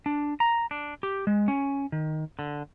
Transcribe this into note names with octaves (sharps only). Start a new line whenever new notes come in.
D4
A#5
D4
G4
G#3
C#4
D#3
D3